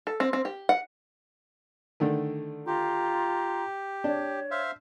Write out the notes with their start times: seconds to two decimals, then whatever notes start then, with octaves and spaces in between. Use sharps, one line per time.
0.07 A4
0.20 C4
0.33 C4
0.45 G4
0.69 F#5
2.00 D3 D#3 A3
2.67 F4 G4 A#5 C6
4.04 D4 C#5
4.51 C5 E5 F5